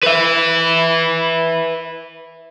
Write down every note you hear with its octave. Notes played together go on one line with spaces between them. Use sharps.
B4 E5